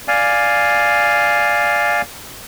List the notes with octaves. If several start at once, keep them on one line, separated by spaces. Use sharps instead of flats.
D5 F5 G#5